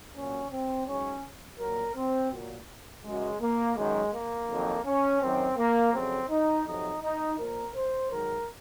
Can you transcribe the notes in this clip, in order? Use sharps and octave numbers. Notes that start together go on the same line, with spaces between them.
A#2 F#3 C#4
C4
G#2 F#3 C#4
A#2 F#3 A#4
C4
A#2 F#3
F#2 C#3 F#3 G#3
A#3
F#2 D#3 F#3 G#3
A#3
F2 D#3 F#3
C#4
F#2 D#3 F#3 C4
A#3
F2 C#3 F#3 C4
D#4
F2 C3 F#3 D#4
D#4
A#2 F3 A#4
C5
G#2 D#3 F#3 A#4